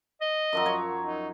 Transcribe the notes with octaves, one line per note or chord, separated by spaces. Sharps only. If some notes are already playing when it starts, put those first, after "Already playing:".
D#5
F#2 F3 F#3
C#5 A#5
D#4